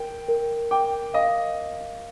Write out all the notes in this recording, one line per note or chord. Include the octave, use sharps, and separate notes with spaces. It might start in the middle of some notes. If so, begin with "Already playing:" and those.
Already playing: A#4 G5
A#4
G5 D6
D#5 F5